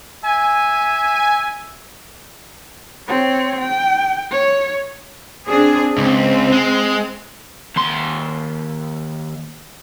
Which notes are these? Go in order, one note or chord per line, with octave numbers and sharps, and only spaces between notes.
E5 G#5
C4 C#5
G5
C#5
C4 D4 G#4
C#2 C4
G#3
D#2 C6